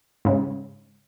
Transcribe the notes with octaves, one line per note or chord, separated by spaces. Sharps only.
G#2 C#3